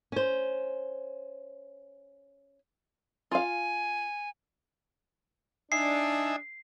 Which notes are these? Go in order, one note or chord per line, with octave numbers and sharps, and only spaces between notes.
C#4 C5
F4 F5 G#5
D4 D#4 E5 G#5 C7